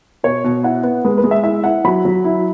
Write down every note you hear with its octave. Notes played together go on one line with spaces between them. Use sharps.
B2 C#5
B2
E4 F#5
B3
G#3 B4
B4
G#3
E5
E4 E5
E4 F#5
F#3 B5
F#3
E4